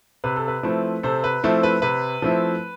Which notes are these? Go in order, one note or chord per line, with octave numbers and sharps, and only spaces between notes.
C3 B4
A4
B4
F3 A3 C4 E4
C3 A4 C5
B4
F3 A3 C4 E4
B4
C3 B4
F3 A3 C4 E4